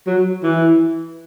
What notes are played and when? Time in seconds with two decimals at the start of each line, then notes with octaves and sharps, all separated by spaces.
0.06 F#3
0.43 E3